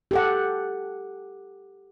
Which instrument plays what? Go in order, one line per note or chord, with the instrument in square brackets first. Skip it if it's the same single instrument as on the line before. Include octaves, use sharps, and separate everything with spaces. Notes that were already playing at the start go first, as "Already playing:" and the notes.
[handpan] G4 A4 F#5